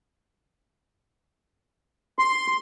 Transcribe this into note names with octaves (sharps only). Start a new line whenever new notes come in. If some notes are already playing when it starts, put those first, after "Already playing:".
C6